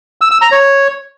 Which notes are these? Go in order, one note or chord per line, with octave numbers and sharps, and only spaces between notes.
E6
E6
A#5
C#5